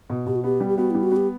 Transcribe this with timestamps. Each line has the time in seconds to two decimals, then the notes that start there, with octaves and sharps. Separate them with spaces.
0.10 B2
0.26 B2 G4
0.36 F#4
0.44 B3 G4
0.60 G3
0.69 G4
0.78 B3 F#4
0.91 G3 E4
1.03 F#4
1.12 B3 G4